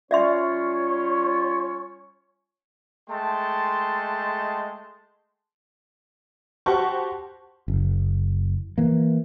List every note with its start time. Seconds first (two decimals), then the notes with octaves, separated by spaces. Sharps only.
0.11 G3 C#4 F4 C#5 D5 E5 C6
3.09 G#3 A3 G5 A5 C6
6.66 F#4 G4 C5 F#5 A5 C#6
7.68 F#1
8.78 E3 A#3